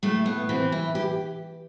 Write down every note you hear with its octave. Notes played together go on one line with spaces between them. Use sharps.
A2 A3
B3
E3 C4
E4
G4